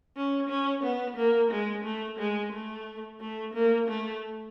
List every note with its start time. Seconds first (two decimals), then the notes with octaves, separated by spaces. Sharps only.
0.16 C#4
0.49 C#4
0.83 B3
1.17 A#3
1.51 G#3
1.84 A3
2.19 G#3
2.52 A3
3.20 A3
3.54 A#3
3.88 A3